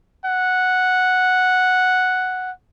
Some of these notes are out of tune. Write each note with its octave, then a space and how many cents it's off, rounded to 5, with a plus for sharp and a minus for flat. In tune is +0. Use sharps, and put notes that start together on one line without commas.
F#5 -5